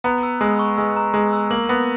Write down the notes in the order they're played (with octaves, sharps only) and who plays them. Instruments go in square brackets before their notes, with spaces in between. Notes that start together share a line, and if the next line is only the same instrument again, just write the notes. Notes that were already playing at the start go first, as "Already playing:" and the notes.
[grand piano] B3 [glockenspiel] A#5
[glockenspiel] E6
[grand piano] G#3 [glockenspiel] E6
[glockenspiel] C#6
[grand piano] G#3 [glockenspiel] E6
[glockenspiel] A#5
[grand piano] G#3 [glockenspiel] A#5
[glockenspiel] E6
[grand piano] A#3 [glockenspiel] F#7
[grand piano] B3 [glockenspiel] A#6